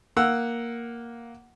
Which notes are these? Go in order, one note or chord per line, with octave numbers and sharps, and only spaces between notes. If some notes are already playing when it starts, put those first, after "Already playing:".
A#3 F#5 E6